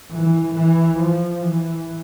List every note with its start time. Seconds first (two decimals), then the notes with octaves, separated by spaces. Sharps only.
0.12 E3
0.56 E3
1.00 F3
1.43 E3